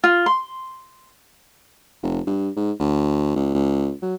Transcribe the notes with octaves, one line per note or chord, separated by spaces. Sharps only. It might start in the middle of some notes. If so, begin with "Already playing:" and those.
F4
C6
F1
G2
G#2
D2
C#2
C#2
F#3